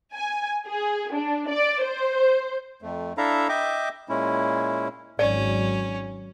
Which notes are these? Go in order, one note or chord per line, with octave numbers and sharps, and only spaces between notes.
G#5
G#4
D4
D5
C5
F2 A3
D4 E4 A4 E5 F5 A#5
D#5 E5 G5 D6
A#2 G#3 C#4 E4
G#1 F#3 C#4 D5